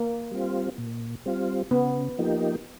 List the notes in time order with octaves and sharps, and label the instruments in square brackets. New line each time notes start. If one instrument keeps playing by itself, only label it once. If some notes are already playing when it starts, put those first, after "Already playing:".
Already playing: [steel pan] A#3
[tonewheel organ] G3 C4 F4
A#2
G3 C4 F4
[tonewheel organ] C#3 [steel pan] B3
[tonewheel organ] F3 A#3 D#4 G4